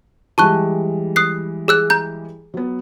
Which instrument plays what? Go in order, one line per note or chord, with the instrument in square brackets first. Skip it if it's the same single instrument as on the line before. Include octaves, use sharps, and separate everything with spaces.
[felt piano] E3 G3 G#3 [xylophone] A5 C#6 F#6
[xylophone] D#6 F#6 C7
G#4 E6 F#6
A#5 G6
[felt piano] F#3 B3